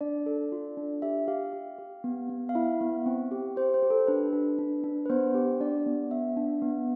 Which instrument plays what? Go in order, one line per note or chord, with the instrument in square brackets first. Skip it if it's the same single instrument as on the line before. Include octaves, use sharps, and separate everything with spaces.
[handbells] D4 D5
A4
F4
D4
G4 E5
G4 F5
G4
G4
B3
B3
F5
E4 E5
B3
C4
G4
G4 C5
C5
G4
A4
D4 B4
D4
D4
D4
B4
B3 C5
G4
D4 D5
B3
B3 E5
D4
B3